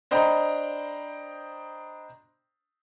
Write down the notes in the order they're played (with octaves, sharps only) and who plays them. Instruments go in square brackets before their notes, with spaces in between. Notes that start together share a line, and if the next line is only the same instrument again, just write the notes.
[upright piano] D4 C5 D#5 G5 A#5 B5